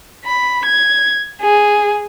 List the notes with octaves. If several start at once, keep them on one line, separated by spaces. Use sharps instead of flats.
B5
G#6
G#4